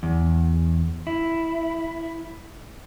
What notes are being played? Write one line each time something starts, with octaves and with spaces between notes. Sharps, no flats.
E2
E4